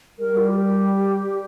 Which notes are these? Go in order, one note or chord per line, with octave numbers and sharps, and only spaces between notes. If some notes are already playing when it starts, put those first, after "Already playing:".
G3 A#4
F4
G4